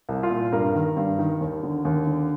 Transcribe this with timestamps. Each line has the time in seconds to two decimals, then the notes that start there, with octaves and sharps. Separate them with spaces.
0.09 C2
0.23 F4
0.30 A#2
0.52 G2 A#4
0.74 D#3
0.97 G2
1.19 D#3
1.41 D#2
1.63 D3
1.85 D#2
2.07 D3